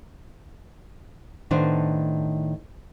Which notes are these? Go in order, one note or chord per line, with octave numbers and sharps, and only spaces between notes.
A2 D#3 B3 D4 C5